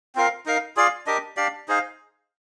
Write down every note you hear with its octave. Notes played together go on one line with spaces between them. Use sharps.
C4 F4 A#4 F5
D#4 A#4 F5
F4 G#4 D5 F5
D4 G4 A#4 D#5
D4 G4 D5 F5
D#4 G#4 C5 F5